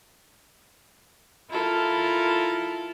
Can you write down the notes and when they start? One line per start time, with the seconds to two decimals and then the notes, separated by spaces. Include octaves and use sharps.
1.49 E4 F4 A4 A#4